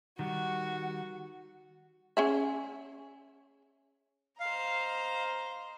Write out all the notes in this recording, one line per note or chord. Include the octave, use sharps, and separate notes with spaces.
D#3 G3 F#4 F#5
C#4 G#4 E5
C5 D#5 F5 A#5